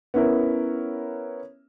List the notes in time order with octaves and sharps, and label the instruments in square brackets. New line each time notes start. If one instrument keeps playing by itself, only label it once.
[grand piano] B3 C#4 E4 A#4